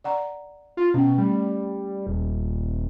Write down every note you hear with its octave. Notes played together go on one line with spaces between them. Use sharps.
D5 F#5 A#5
F4
B2 C#4 G5
G3 A3
D#1